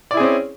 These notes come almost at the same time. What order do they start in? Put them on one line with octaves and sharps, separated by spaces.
D5 E4 G#4 C4 C#4